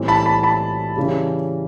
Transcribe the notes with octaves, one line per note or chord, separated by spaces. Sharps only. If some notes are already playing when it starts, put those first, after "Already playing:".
Already playing: A2 E3 G3 C4
A5 B5
A5 B5
A5 B5
C#3 E3 G3